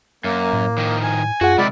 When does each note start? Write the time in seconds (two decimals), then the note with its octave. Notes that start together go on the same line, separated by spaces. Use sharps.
0.24 F#2 A#3
0.53 A2
0.78 D#3 F3
1.03 G#5
1.41 F#2 F4 F#4 G#4 F#5
1.58 C3 D#3 G#3 D5 B5